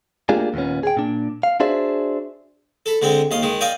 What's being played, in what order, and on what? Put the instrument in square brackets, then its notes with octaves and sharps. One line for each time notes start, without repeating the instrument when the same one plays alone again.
[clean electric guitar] A3 A#3 D4 F4 G4 G#4
D#2 A#2 B3 C#4
G#4 G5
A#2 D4
F5
D4 F#4 G#4 C5 D5 E5
[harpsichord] A4 B5
D3 G#3 C4
D#2 D#5 F5
D#3 G#3
D5 D#5 F5 G5 G#5